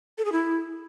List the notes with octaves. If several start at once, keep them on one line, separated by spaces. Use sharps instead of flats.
A4
G#4
E4